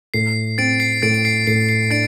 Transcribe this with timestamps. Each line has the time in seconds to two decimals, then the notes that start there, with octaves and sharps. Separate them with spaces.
0.14 A2 C7
0.58 C4 A6 D7
0.80 C7
1.02 A2 A6 D7
1.14 D7
1.25 C7
1.47 A2 C7
1.69 C7
1.90 D4 A6 D7